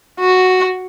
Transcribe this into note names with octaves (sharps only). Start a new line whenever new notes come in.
F#4